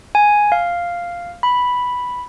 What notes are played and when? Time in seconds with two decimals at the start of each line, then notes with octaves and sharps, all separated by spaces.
0.15 G#5
0.52 F5
1.43 B5